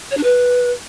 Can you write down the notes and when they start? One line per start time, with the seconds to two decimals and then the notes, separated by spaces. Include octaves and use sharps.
0.11 C#5
0.17 D4
0.23 B4